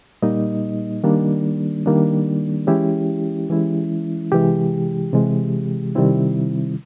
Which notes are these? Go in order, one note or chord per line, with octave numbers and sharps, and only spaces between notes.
A#2 G3 A#3 D#4 D#5
D#3 G3 A#3 D4
D#3 G3 A#3 D4
E3 G#3 C#4 E4 G4
E3 G#3 C#4 E4
C3 E3 G#3 G4
C3 E3 G#3
C3 D#3 G3 C4 E4